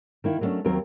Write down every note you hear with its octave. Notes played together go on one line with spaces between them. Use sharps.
D#3 A#3 E4
F#3 G#3 A3 B3 C#4 D4
D#2 F#3 C4 A#4